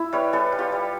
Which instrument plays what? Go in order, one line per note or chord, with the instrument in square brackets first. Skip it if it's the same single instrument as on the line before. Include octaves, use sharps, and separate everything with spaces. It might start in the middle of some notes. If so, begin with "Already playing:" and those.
Already playing: [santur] E4 E5
G3 B4 C#5
G3 A4 B4
G3
F4 G4
G3